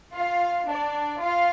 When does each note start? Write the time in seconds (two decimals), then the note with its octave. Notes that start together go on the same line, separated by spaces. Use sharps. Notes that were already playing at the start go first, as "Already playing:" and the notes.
0.14 F4 F5
0.68 D4 D5
1.21 F4 F5